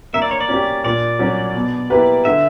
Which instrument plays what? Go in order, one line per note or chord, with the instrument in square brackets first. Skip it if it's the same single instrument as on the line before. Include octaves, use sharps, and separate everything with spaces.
[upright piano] A#3 [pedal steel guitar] E5
[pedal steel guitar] D5
C#5
D5
[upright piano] C#4 G4
[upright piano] A#2 [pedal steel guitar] D5
[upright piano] F#3 C#4
B2
A#3 E4 G4 B4
[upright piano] D3 [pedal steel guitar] E5